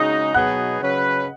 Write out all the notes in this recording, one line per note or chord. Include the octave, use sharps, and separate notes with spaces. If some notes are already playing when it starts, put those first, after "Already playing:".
Already playing: C#3 G#3 D#4 F#4 D#5 D#6
B2 F#3 B3 D#4 G#4 F#5 F#6
C#3 F#3 C#4 B4